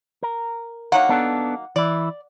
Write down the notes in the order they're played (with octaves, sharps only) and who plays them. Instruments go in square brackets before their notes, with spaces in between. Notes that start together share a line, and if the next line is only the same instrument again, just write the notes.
[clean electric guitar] A#4
[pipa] D#3 F#3 A#3 [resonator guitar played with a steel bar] F#5
[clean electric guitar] B3 D4 A4
[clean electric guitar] E3 E4 [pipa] D5